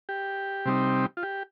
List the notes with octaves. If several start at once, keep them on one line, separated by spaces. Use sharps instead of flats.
G4
C3 G3 C4 D#4
F4
G4